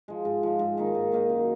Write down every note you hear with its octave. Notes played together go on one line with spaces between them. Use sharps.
F3 G#3
G#2
F3 G#3
G#2
D#3 A#3 D#4
G#2
D#3 A#3 D#4
F#2